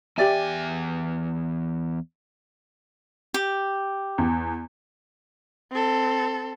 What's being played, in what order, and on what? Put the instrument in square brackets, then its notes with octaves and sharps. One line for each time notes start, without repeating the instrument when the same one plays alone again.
[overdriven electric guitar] E2 G#5 [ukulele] G4 D5 E5
[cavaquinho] G4
[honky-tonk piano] E2
[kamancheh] C4 A4